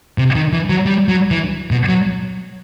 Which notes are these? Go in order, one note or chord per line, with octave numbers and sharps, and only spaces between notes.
C3
D#3
E3
F#3
G3
F#3
E3
B2
F#3